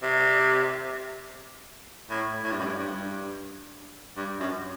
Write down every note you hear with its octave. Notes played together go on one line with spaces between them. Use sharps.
C3
A2
A2
G2
F#2
G2
G2
G2
F#2